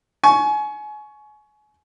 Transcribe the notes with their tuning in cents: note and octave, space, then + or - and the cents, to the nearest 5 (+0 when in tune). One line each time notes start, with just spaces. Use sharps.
G#5 +30 C#6 +5